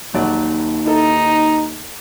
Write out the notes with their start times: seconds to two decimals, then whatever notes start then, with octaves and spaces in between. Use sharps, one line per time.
0.14 A#1 D#2 F#3 D5
0.86 D#4 E4 A4